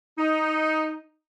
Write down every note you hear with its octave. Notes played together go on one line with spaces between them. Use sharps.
D#4